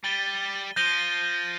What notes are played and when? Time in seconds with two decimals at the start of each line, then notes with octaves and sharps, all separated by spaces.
0.04 G3 A6 D#7 G7
0.76 F3 G6 A#6 D#7 G7